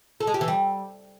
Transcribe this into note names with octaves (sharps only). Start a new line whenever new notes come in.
A4
G#3
G4
E3
G3